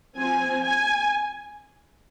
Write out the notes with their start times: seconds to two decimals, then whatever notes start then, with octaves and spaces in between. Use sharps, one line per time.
0.17 F3 C4 G#5
0.62 G#5